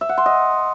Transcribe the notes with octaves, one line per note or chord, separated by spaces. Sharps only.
E5
F#5
C6
D#5